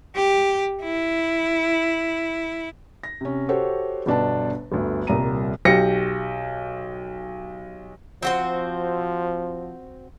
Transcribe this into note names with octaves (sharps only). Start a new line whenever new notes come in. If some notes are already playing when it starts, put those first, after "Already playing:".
G4
E4
A#6
C3 C#4
F#4 G4 A4 C5 C#5
G1 B2 D4 B4 A5
G1 D2
D#1 C2 A#3 A#5 D#7
B1 G4 A#6 C#7
F3 C4 F#4 C5